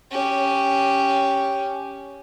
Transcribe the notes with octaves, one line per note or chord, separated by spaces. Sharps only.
C#4 G4